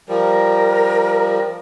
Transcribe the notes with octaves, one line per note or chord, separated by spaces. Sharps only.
F3 G3 A#4